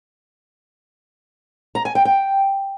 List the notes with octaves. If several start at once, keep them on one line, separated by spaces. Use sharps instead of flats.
A#5
G#5
G5
G5